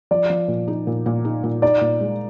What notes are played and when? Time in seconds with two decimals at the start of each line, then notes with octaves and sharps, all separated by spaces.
0.11 F3 D5
0.30 F3
0.48 A#2
0.68 D#4
0.87 A#2
1.06 A#2
1.25 D#4
1.44 A#2
1.62 D#4 D5
1.81 A#2
2.00 G#3